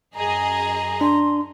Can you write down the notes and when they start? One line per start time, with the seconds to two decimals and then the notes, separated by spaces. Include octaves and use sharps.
0.16 F#2 G#4 D#5 A#5
1.01 D4 C6